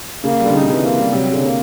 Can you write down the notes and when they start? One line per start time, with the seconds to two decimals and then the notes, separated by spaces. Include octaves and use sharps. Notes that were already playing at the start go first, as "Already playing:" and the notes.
0.24 C#3 A#3
0.39 G3
0.46 D3
0.53 C#3 D#4
0.61 C3
0.68 C#3 E3
0.82 A#3
0.97 G3
1.12 C3 F#3
1.27 C#3
1.33 D3
1.41 A#3